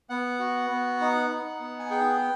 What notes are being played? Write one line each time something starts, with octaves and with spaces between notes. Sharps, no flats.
B3 F#5
F#4
B3
D#4
D#4
B3
G#5
G#4 G5